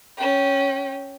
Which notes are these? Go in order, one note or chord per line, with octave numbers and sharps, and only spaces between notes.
C#4 G5